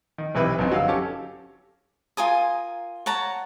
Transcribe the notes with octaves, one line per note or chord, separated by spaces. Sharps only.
D#3
B1 C3 E3 B4
G1 F#2 C4 D#4
F#3 F5 E6
C#4 G4 A4
F4 A#4 G#5 D#6
C#5 F#5 A5 A#5